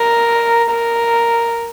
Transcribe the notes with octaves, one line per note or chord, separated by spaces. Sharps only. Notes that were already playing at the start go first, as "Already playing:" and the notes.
Already playing: A#4
A#4